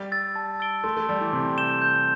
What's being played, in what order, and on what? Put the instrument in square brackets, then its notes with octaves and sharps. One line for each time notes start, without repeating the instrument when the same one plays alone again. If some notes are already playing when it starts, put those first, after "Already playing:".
Already playing: [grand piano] G3
[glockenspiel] E6 A6
A5
E6 A6 D7 G7
[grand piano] A3 [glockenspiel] C6
[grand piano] A3
[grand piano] G3 [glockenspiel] E6 A6
[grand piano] E3
[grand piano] C3 [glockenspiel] C6
[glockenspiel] G6 E7 G7
G6